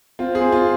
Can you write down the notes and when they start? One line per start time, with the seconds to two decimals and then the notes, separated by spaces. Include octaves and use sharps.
0.19 C4 F4
0.35 G#4
0.41 C4
0.52 F4